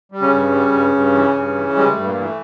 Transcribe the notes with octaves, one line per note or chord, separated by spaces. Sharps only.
G3
C#3 C#4
G2
G3
G2
G2
E3
G2
E3
G3 G#3
A3
G2
A#2 A#3
E3
A3